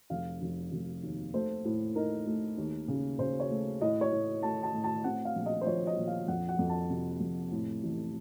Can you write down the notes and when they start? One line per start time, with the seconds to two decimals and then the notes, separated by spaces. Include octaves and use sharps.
0.10 F1 F5
0.41 F1
0.72 F1
1.03 D#2
1.34 A3 C5
1.65 A2
1.95 D#4 A#4
2.26 A3
2.57 D#2
2.88 C#3
3.19 C#3 C5
3.40 C#5
3.50 A3
3.81 A2 D#5
4.01 C#5
4.12 A2
4.42 A3 A5
4.63 A5
4.73 A2
4.84 A5
5.04 C4 F#5
5.25 F5
5.36 A#1
5.46 D#5
5.61 C5
5.66 F3 C#5
5.87 D#5
5.97 A#1
6.07 F5
6.28 F2 F#5
6.49 F#5
6.59 F2
6.69 A5
6.90 C3
7.20 F2
7.52 A2
7.83 A1